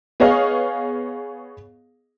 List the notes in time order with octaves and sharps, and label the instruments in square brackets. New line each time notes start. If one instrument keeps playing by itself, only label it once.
[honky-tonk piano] B3 G#4 C#5 D#5 F5